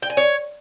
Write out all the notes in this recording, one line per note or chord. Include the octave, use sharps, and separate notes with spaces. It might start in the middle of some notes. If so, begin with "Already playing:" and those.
G5
G#5
C#5